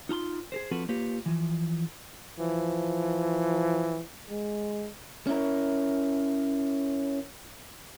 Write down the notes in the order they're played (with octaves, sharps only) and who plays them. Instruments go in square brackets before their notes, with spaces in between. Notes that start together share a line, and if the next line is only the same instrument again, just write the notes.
[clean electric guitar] D#4 F4 A#5 C6
G#4 A#4 C5
F3 C4 F4 F#4 A4 B4
A#3 F4 G4 B4 C#5
E3 F3
[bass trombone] E3 [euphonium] F3
[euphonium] G#3
[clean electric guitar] C#4 E4 A#4